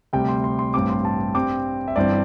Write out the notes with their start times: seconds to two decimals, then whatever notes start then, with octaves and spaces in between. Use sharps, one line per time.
0.13 D2 C3 G3 C4 G5
0.28 C6
0.44 C6
0.59 C6
0.74 A1 G2 G3 C4 D6
0.90 C6
1.05 A5
1.35 G2 G3 C4 D6
1.88 E5
1.96 G1 G2 E3 C4 D5